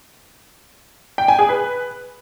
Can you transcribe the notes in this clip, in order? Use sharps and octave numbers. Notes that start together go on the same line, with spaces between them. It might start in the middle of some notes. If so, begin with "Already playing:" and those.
G5
G#5
G#4
B4